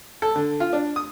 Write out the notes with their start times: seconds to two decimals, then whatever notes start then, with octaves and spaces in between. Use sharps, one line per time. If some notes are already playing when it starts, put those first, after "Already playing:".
0.22 A4
0.36 D3
0.60 F4
0.73 D4
0.96 D#6